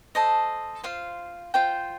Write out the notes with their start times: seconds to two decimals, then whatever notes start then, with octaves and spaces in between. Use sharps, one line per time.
0.15 A4 C5 D#5
0.83 F4 C5 F5
1.54 F4 C5 G5